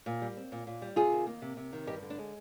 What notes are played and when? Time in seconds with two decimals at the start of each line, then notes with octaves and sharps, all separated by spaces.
0.06 A#2
0.22 G3
0.37 C4
0.52 A#2
0.67 A#2
0.82 G3
0.96 C3 F4 G#4
1.12 D#3
1.27 A#3
1.42 C3
1.57 C3
1.73 D#3
1.87 G2 D#4 G4
2.02 D3
2.10 D4
2.18 G#3